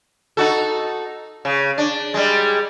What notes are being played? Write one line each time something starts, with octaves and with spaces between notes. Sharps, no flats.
D#4 F#4 A4
C#3
D4
G3 G#3